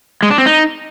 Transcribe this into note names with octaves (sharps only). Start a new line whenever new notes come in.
G#3
D4
C4
D#4